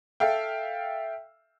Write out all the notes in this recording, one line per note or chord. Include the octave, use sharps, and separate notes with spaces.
A4 E5 F5 G5